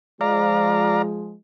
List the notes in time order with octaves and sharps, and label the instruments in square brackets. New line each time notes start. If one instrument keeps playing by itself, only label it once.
[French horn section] F3 G#3 [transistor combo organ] D5 F5 A#5